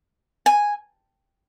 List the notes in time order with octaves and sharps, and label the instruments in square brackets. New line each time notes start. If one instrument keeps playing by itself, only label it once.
[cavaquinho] G#5